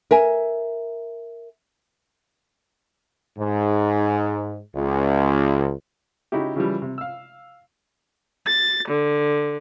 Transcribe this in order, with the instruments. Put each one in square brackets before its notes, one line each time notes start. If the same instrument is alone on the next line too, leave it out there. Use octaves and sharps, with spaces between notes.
[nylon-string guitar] A#4 E5 G#5
[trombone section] G#2
C#2
[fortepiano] C#3 D#4 E4 F#4 G4
C#3 E3 F3 G3
C3
F5 E6
[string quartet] A6
D3